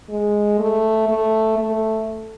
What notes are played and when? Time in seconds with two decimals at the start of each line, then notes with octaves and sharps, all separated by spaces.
0.10 G#3
0.59 A3
1.09 A3
1.58 A3